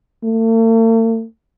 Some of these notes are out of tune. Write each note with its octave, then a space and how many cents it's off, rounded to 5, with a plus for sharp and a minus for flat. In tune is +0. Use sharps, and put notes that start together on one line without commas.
A3 +45